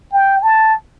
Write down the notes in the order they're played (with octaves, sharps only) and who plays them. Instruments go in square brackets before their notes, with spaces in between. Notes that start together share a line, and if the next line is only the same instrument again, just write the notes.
[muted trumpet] G5
A5